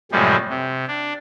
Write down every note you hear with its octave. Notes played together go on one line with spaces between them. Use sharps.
F#2 A2 C3 F3 G3 G#3
C3
D4